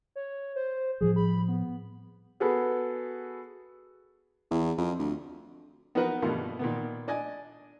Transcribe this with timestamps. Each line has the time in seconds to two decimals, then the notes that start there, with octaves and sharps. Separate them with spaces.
0.16 C#5
0.56 C5
1.01 A2 F3 G3 G#4
1.16 B5
1.48 B3
2.40 B3 F#4 G#4 A4 B4
4.51 E2
4.78 F2
4.99 D2
5.95 B3 D#4 F#4 A#4 B4
6.22 G2 B2 D#3 A3 A#3 F4
6.59 A#2 D#3 B3
7.08 D4 D5 D#5 G#5